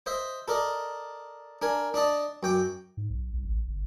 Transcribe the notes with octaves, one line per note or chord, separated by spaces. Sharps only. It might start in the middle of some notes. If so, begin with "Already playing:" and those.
C5 D#5 E5
A4 A#4 D5 D#5
D4 A#4 G#5
D4 D5 D#5 A5
F#2 G5 D6
G#2
B1
C2
A1
G1